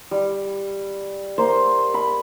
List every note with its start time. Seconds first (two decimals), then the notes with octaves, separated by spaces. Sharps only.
0.11 G3
1.38 A#3 C5
1.94 B5